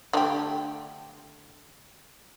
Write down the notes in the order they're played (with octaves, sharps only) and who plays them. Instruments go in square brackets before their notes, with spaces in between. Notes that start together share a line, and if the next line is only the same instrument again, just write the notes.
[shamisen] D3 A3 G4